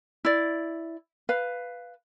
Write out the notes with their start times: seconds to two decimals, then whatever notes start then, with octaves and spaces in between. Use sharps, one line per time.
0.25 E4 D5
1.29 B4 F5